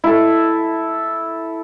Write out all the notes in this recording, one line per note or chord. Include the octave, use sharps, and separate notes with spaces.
E4 A4